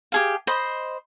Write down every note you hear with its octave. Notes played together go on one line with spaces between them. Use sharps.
G4 G#4 F5
C5 D#5 B5